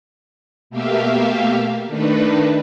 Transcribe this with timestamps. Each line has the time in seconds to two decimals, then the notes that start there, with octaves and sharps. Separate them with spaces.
0.70 B2 A3 A#3 G4 E5 F5
1.87 D#3 A3 D4 D#4 B4